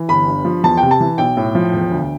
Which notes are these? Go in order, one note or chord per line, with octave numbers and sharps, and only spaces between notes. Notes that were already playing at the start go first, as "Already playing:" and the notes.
Already playing: E3
G1 B5
G2
F3
E2 A5
G5
C3
A5
E3
B1 G5
A2
F3
E1
D2